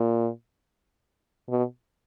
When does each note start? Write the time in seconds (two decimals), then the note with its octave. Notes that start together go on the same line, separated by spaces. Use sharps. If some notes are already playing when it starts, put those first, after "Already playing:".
Already playing: A#2
1.49 B2